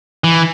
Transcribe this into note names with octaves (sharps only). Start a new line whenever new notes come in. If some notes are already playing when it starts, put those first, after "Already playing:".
E3